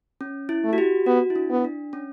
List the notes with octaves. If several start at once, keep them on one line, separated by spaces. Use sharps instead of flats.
C#4
E4
A3
F#4
G4
B3 F#4
E4
D4
B3
D4
C#4